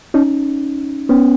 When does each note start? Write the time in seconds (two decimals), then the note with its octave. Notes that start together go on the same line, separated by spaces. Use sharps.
0.14 C#4 D#4
1.09 B3 C#4